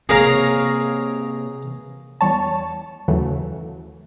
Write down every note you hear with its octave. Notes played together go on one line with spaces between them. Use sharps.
C3 A#3 C4 G#4 A#4 C#5 F5 A#5
E2 G3 C#5 A5
D#2 C#3 E3 F#3 A3